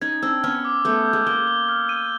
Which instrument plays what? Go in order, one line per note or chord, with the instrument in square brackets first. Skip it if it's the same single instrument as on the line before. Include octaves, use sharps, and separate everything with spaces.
[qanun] C#4 D#4 [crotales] G#6
[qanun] C4 D4 [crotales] E6
[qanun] B3 C#4 [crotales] F6
[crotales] D6
[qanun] A3 B3 [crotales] G6
[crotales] G6
[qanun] G#3
[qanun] A#3 [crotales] G7
[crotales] G7
F6
D#7